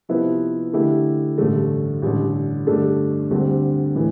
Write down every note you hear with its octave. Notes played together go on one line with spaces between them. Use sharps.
C3 F3 B3 E4 B4
D3 A3 E4 G4
A1 G2 D3 A3
A1 G2 D3
G2 D3 A3 D4 A4
D2 D3 G3 C4
A2 E3